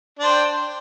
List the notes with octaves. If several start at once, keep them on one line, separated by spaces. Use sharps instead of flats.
D4 C5 G5